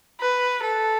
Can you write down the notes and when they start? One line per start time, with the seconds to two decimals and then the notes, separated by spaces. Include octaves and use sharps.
0.21 B4
0.63 A4